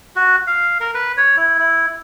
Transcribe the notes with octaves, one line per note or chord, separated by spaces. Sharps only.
F#4
F5
A#4
B4
C#5
E4
E4